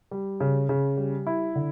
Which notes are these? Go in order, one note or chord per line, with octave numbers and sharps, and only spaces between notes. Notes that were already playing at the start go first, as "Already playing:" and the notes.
G3
C#3
C#3
G3
E4
D3